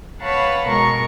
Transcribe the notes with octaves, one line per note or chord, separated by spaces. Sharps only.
B4 C#5 F5 F#5 A5 B5
B2 G#3 A#4 C#6